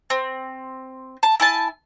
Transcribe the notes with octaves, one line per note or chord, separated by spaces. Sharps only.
C4
A5
E4 G#5 A5